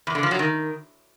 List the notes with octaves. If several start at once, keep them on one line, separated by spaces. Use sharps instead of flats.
E2
D3
F3
F#3
D#3